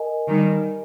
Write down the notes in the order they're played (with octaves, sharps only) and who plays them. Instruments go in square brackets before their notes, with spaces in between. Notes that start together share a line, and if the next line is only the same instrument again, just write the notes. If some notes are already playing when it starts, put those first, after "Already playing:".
Already playing: [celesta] A#4 D#5 G#5
[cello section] D#3 G3